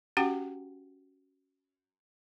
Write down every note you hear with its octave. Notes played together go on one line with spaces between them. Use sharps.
C#4 F#4 G4 F#5 G5